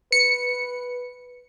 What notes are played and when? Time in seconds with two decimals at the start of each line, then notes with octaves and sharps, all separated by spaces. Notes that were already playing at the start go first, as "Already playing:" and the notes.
0.12 B4 C#7